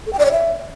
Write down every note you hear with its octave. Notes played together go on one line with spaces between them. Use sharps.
A4
G5
D5
C#5
E5